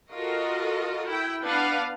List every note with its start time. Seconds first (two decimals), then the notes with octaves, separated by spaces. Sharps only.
0.13 F4 F#4 A4 A#4 D#5
1.07 E4 G5
1.45 B3 D4 B4 F5 F#5